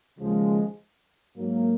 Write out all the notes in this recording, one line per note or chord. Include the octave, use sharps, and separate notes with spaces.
D#2 C#3 F3 G#3
G#2 F#3 A#3